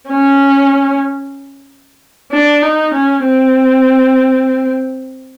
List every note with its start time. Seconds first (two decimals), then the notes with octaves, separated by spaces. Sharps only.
0.09 C#4
2.32 D4
2.62 D#4
2.94 C#4
3.26 C4